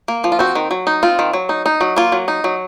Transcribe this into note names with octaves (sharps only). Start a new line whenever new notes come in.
A#3
F3
F4
C4 F#4
D#3
F#3
D#4
C4 F4
D#3
F#3
D#4
D#4
F#3
A#3 F4
F#3
D#4
F#3